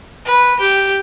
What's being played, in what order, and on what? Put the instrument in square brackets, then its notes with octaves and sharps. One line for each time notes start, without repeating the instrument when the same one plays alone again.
[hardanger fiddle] B4
G4